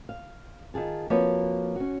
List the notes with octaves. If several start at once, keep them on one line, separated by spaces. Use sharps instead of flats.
F5
D#3 F4 G#4 A5
F3 A#3 C4 F#4 B4 C#5
C#4 F#4